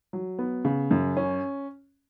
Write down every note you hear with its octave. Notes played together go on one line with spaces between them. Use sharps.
F#3
B3
C#3
F#2
C#4